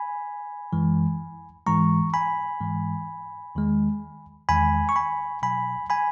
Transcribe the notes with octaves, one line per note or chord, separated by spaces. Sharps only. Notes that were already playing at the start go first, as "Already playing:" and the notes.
Already playing: G#5 B5
F#2 E3 G#3
G#2 E3 G#3 A#5 C#6
G#5 B5
G#2 E3 G#3
E2 D#3 G#3
E2 D#3 G#3 G#5 B5
C#6
G#5 B5
B2 F#3 G#5 B5
G#5 B5